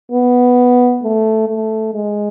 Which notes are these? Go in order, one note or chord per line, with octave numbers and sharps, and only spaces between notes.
B3
A3
A3
G#3